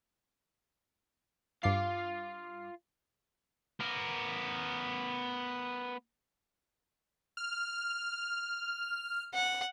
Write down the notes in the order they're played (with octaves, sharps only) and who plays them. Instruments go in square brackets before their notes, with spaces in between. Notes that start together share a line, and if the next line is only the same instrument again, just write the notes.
[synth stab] G2 D6 C7 [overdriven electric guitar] F4 F5
[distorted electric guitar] B3 A#4
[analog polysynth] F6
[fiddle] F#5